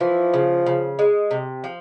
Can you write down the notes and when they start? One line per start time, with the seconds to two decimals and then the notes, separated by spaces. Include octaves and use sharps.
0.01 E3 F3
0.34 C#3
0.66 C#3
0.99 G#3
1.31 C3
1.64 F3